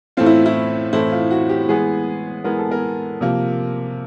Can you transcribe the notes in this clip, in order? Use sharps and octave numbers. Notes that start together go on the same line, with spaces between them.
A2 E3 A3 C4 F4
E4
E4
A2 E3 A3 C4 E4
F4
F#4
G4
E3 G#3 B3 G#4
E3 G#3 B3 A#4
A4
A#4
C3 F3 A#3